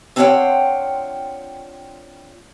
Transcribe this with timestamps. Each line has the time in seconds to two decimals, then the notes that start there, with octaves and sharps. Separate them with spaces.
0.16 C4 D4 F4 C#5 F#5 G5